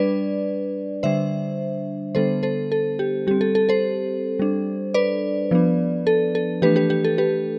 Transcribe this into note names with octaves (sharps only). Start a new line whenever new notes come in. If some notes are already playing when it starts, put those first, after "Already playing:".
Already playing: G3 D4 B4 D5
D3 G3 D4 C5 E5
D3 G3 B3 D4 A4 C5
A4 C5
A4
G4
G3 C4 G4
A4
A4
A4 C5
G3 D4
B4 D5
F3 B3 D4
A4
A4
E3 A3 D4 G4 B4
G4 B4
G4
A4
G4 B4